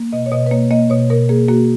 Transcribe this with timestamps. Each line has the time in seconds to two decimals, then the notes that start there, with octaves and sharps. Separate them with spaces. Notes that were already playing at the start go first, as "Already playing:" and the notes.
Already playing: A#3
0.13 B2 D#5
0.26 C#5
0.32 B2 D#5
0.46 B4
0.52 A#3 C#5
0.71 A#3 D#5
0.90 B2 C#5
1.10 B2 A#4
1.29 A#3 G#4
1.48 A#3 F#4